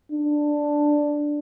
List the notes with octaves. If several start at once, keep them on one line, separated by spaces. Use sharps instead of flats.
D4